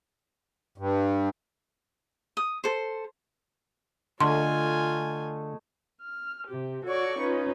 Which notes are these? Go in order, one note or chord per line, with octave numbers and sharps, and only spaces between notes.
G2
D#6
A4 C5
D3 A3 F4 G#4 D#5 G#5 C6
F6
C3 G4
F#4 A4 C#5 D5 C#6
C#4 D#4 F4 B4